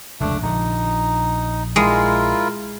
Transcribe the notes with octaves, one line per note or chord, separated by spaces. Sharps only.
F1 C#2 F#2 A3 D4
A#1 D3 D#4
G#3 E4 F4 A#4